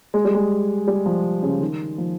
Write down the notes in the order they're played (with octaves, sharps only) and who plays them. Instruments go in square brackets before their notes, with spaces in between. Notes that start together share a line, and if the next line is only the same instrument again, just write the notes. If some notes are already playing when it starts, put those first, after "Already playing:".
[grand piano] G#3
G3
G#3
G3
F3
C#3
D#3
F3